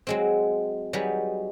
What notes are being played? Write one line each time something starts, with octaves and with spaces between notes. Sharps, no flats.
F#3 G#3 C4
F#3 G3 D#4 G#4 B4